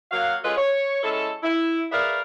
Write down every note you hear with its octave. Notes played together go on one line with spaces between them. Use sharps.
F#3 A#3 F#4 F5
G#3 C#4 F4 G#4 A4 B4
C#5
G#3 C#4 E4 A4
E4
G#4 A#4 B4 D5 E5 F5